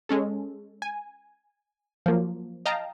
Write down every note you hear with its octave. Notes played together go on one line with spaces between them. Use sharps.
G#3 C#4 A4
G#5
F3 F#3 A#3
D#5 F5 G5 A5 A#5